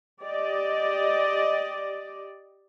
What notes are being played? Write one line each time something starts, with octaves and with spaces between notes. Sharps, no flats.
G4 D5 D#5